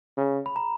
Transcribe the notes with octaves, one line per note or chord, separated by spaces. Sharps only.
C#3
B5
A#5